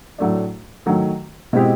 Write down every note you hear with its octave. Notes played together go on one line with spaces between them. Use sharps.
A2 F#3 A3 D4
D#3 F#3 A3
B2 G#3 C4 E4 G4